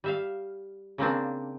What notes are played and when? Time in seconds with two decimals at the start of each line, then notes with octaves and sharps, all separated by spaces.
0.04 G3 E5 F5
0.98 C#3 A#3 C4 D4